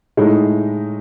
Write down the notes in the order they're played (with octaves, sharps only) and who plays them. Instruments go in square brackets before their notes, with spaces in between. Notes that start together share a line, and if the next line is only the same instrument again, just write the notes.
[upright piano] A2 G#3 D#4